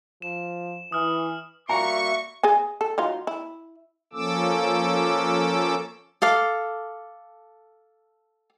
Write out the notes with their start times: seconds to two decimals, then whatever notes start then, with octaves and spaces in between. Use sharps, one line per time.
0.22 F3 E7
0.92 E3 D#6 F6
1.69 G3 A#3 F#4 E5 A#5 C#6
2.43 G#4 D#5 G#5
2.81 A4
2.98 F#3 D#4 F4
3.27 E4
4.13 F3 A#3 C#4 A4 D6 E6
6.22 A4 F5 D6